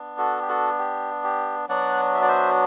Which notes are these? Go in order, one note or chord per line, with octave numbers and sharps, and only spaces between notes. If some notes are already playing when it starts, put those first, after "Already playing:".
Already playing: B3 D4
F#4 A4
G4
F#4 A4
G4
G4
F#3 B3 D4 F#4 D5 F#5
E5
D5
C5 E5